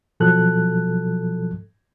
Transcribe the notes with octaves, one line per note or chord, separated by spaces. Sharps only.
B2 F3 F#3 A4 F#6